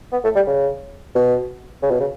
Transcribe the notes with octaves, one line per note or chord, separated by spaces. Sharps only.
B3
A3
G3
C#3
B2
C#3
B2
C#3